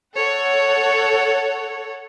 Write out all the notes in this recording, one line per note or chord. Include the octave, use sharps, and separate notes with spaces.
A4 C#5 F#5